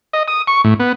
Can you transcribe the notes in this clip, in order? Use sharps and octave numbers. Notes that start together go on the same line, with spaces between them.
D#5
D#6
C#6
A2
B3